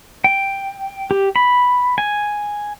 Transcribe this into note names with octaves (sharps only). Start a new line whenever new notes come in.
G5
G4
B5
G#5